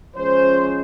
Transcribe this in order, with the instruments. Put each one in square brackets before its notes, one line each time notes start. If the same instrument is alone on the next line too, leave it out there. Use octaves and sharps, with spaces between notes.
[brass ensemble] F3 G#3 C#4 C5